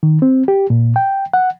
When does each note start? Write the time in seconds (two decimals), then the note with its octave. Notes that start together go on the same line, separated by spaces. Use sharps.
0.03 D#3
0.22 C4
0.48 G4
0.70 A#2
0.96 G5
1.34 F#5